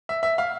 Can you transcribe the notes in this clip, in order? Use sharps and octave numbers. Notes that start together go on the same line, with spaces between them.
E5
E5
F5